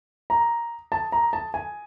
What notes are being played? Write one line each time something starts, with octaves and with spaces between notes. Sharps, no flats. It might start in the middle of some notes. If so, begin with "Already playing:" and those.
A#5
A5
A#5
A5
G#5